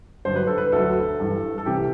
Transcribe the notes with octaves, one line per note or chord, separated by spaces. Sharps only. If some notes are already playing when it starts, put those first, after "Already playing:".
G2 D3 F#3 C5
B4
A4
B4
D2 D3 F#3 A4
G2 E3
A4
C2 C3 E3 G4